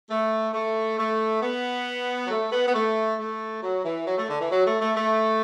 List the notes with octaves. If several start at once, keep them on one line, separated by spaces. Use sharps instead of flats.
A3
A3
A3
B3
F#3
A3
B3
B3
A3
A3
F#3
E3
F#3
A3
D3
E3
F#3
A3
A3
A3